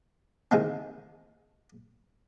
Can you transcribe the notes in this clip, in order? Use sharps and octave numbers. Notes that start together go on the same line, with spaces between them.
D#3 E3 G#3 C4